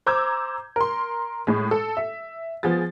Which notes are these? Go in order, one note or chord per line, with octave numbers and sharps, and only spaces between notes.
C5 A#5 D6 E6 G6 G#6
A#4 C6
A2 G#3
A4
E5
F3 B3 G#4 A6